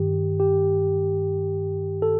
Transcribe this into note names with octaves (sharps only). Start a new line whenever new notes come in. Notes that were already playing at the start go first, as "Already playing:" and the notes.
Already playing: G2 D#3 G4
G4
A4